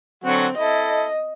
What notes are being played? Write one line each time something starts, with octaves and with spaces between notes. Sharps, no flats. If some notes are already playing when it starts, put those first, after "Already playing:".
D3 F#3 C4 F#4
E4 A4 D#5